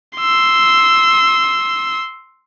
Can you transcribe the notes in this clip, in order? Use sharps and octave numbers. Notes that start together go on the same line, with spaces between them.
C6 E6